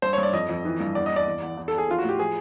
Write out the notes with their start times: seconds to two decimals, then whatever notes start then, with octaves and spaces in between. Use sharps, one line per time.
0.02 G2 C5
0.13 C#5
0.18 G2
0.23 D5
0.33 F2 D#5
0.49 F2
0.65 E3
0.80 G2
0.95 E2 D5
1.06 D#5
1.11 E2
1.16 D5
1.27 E2
1.42 E2
1.57 E2
1.68 A4
1.73 E2
1.78 G#4
1.88 F3 F4
1.98 F#4
2.04 A2 G4
2.19 F3 G#4